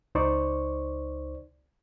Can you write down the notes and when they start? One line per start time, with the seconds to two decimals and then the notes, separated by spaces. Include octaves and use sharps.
0.15 C#2 D#4 C5 D5 C#6